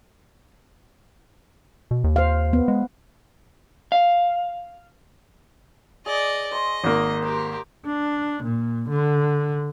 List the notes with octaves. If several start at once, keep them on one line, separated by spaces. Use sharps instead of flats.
B2
D#2
C5 F5
B3
G#3
F5
G#4 D5 D#5
C5 D#5 C6 C#6
G#1 A#3 D#6
G4 A#4 C5
D4
A#2
D3